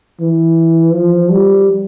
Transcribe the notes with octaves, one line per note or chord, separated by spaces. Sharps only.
E3
F3
G3